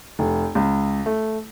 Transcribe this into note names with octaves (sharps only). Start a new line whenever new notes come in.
F1
C#2
A3